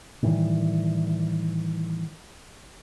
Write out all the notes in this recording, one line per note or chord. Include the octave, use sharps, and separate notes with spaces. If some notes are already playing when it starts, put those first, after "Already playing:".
A2 D#3 E3 G3